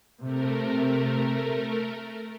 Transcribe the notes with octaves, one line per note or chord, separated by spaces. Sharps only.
C3 A3 A#4